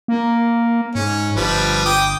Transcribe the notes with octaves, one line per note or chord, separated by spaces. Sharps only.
A#3
G#2 C#4
G1 F3 G3 B4
G5 D6 D#6